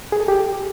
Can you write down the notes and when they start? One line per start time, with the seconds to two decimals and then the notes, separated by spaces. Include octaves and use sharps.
0.12 G#4
0.20 A4
0.28 G4